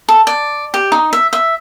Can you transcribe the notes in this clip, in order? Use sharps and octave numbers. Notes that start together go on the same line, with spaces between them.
A4
D5
G4
D#4
E5
E5